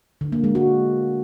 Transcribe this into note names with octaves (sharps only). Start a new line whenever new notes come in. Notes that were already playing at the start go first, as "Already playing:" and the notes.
D3
A#3
G#3
F#4